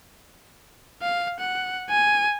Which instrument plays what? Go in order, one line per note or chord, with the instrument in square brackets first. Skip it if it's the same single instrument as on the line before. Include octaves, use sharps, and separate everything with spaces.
[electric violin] F5
F#5
G#5